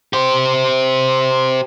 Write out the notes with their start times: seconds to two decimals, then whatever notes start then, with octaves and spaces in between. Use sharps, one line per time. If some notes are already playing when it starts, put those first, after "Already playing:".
0.13 G4 C5